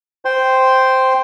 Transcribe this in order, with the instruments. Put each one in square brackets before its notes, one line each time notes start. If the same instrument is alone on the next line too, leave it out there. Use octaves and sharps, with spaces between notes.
[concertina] C5 G5 C6